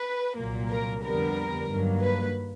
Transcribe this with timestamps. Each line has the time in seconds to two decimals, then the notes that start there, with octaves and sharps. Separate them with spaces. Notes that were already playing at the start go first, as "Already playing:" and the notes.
Already playing: B4
0.36 C2 A#2 F#3 A#3
0.70 A#4
1.03 F2 D3 G3 B3 A#4
1.69 G2 D#3 F#3 A#3
2.02 B4